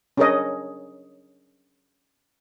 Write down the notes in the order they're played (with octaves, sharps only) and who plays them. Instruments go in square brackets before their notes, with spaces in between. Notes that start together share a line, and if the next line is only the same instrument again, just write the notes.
[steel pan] C#4 D4 G#4 A#4 C#5 D#5